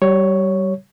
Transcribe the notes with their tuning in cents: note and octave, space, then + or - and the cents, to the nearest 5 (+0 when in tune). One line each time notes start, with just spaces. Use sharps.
G3 -25 C#5 +0